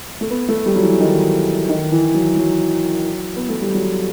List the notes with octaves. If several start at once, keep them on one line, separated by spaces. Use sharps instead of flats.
A3
B3
A3
G3
F#3
E3
D#3
D#3
E3
F#3
F#3
B3
A3
G3
F#3